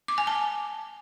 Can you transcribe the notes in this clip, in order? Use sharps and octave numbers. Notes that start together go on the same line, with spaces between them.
D6
G#5
A5